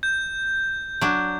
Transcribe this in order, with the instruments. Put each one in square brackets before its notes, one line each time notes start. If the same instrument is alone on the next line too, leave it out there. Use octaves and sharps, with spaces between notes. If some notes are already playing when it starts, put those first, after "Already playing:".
[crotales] G6
[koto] F#3 D4